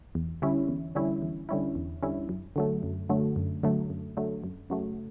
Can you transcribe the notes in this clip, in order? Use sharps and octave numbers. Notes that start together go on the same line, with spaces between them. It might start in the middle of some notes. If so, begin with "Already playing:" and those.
E2
D3 G3 C#4 E4
E2
D3 G3 C#4 E4
E2
D3 G3 C#4 E4
E2
D3 G3 C#4 E4
F#2
D3 F#3 A3
F#2
D3 F#3 A3
F#2
D3 F#3 A3
F#2
D3 F#3 A3
F#2
C#3 F#3 A3